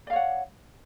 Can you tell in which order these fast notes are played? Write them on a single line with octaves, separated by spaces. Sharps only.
D5 F5 C#5 F#5